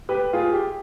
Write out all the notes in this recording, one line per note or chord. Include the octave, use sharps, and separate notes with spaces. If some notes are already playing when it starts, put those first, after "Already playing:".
G4 B4
F4 G#4
G4